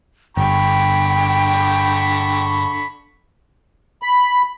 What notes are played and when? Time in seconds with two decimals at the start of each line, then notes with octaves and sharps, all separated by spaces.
0.37 G1 D3 G5 B5 C#6
4.02 B5